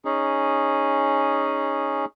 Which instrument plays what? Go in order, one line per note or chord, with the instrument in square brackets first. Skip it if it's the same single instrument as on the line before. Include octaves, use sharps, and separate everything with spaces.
[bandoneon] C#4 D#4 G#4